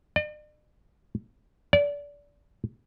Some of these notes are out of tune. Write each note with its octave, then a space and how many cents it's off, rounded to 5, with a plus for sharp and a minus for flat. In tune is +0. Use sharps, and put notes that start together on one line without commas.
D5 +45
D5 -25